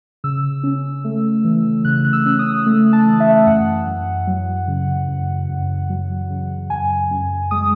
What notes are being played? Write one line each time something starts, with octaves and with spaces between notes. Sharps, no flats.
C#3 E6
C#4
A3
E3
C#3 F#6
F#6
E6
C#4
D#6
A3
A5
E3
E5
F#2 F#5
F#2
F#3
C#3
F#2
F#2
F#3
C#3
F#2 G#5
F#2
G#3 D#6